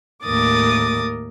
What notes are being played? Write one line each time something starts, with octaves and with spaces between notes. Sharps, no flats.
D#2 A2 A#4 D6 D#6 A6